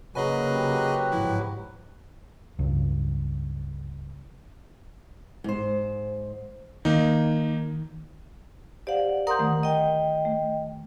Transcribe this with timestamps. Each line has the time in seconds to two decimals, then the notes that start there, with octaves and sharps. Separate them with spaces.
0.15 C#3 F#3 A#3 F#4 G#4 B4 D#5 G#5
0.54 G4
1.12 G1 G#2 F3 E4
2.59 C#2 G2
5.44 G#2 C5
6.85 D#3 A#3 D#4
8.87 G4 C5 D5 F5 F#5
9.27 A#4 F#5 A#5 C6 D#6 G6
9.39 D3 D#3 A3
9.63 D#5 G5
10.25 A3